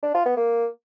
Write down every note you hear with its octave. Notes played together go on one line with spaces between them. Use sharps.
D4
F4
B3
A#3